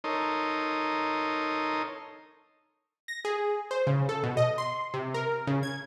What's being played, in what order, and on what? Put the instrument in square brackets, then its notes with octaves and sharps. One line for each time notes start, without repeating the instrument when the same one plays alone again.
[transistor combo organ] D#4 A4 A#4 C#5 C6 D#6
[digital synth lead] A#6
G#4
C5
C#3
A4
B2
D#5
C6
C3
A#4
C#3
G#6